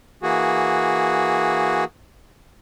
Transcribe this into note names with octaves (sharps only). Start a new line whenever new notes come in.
E3 A#3 F#4 G#4